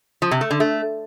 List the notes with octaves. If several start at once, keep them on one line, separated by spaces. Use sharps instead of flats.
F3
C3
A3
D3
A3